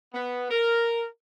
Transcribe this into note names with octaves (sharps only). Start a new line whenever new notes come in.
B3
A#4